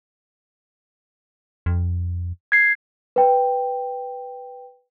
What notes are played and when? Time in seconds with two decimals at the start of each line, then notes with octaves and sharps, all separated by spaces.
1.66 F2
2.52 G#6 C7
3.16 B4 G5